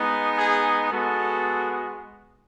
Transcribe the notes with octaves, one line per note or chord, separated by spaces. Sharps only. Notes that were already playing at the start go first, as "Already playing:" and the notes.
Already playing: G#3 B3 D#4
G#4
G#3 B3 F#4 A4